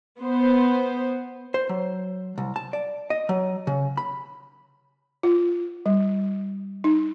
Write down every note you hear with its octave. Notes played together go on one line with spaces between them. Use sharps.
B3 C5
C5
F#3
C2
A5
D5
D#5
F#3
C#3
B5
F4
G3
D#4